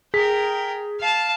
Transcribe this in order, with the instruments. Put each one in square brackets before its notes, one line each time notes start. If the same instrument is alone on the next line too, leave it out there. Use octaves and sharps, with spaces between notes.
[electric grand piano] G#4 B6 [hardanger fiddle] A#4 G5
[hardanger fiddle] F5 A5